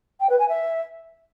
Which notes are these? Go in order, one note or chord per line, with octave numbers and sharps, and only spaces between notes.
G5
B4
G#5
E5